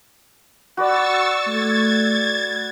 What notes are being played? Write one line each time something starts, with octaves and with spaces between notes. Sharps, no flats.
F#4 B4 D5 C#6 E6 A6
A3 G#6 A6